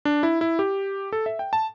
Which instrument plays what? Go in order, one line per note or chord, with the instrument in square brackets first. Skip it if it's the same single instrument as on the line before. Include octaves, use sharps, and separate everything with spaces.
[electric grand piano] D4
E4
E4
G4
A4
E5
G5
A5